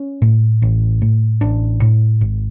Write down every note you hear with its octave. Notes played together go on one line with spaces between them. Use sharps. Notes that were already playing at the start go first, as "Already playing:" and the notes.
Already playing: C#4
A2
A1
A2
A1 D4
A2
G#1